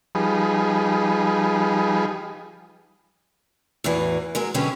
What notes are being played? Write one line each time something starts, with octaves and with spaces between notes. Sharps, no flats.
F3 G3 D#4 G#4 B4
E2 A2 E3 F#4
F#3 G#3 A#4
B2 D3 F#3 G#3 C#4 G4